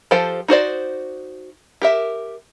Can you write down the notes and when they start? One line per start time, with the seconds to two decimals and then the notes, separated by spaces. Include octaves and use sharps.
0.11 F3 G4 A4 C5 G5
0.48 D#4 F#4 C5 D5
1.82 G4 A#4 E5